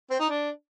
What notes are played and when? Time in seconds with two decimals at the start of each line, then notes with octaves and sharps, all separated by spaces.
0.10 C4
0.20 D#4
0.29 D4